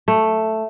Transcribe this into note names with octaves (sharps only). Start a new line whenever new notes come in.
A3